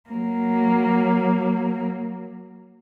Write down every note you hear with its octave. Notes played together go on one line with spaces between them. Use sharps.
F#3 A#3